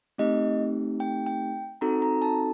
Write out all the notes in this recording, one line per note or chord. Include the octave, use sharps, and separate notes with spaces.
A3 C4 D#4 G4 D#5
G5
G5
C4 D#4 F#4 A4 A#5
A#5
A5